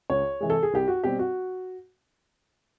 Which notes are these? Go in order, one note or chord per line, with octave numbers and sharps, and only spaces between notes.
C#2 C#5
C3 E3 G#3
A4
G#4
C2 G4
F#4
B2 G3 C4 G4
F#4